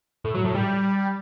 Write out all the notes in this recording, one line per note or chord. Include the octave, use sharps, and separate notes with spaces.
A2
F#3
A2
G3